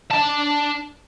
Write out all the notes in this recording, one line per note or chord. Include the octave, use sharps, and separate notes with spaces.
D4 A5